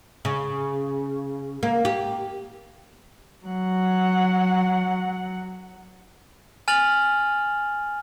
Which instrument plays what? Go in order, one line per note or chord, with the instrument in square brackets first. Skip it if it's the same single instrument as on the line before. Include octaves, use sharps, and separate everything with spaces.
[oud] C#3
A#3
G4
[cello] F#3 F#5
[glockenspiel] G#5 F6 A6 F7 F#7